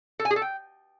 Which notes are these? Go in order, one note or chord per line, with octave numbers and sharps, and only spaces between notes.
A4
G#5
G#4
A4
G5